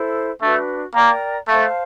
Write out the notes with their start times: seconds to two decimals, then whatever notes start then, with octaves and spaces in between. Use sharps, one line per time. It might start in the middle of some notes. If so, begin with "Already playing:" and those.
Already playing: E4 A4 C5
0.41 A3 D4 F#4 B4
0.94 A#3 A#4 D5 G5 A#5
1.48 A3 C5 F5 A5